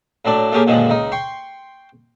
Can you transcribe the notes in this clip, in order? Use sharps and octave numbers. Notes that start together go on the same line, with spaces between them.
A2 F#3 A3 D4
A3 A#3 C#4 G4 G#4 A#4
F#2 A#2 D3 D#3 F3 G#3
C#2 D#4
G5 C6 C#6